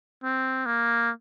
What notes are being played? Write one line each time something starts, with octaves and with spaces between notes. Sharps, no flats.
C4
A#3